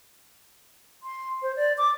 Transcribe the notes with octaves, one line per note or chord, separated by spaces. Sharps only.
C6
C5
D5
D6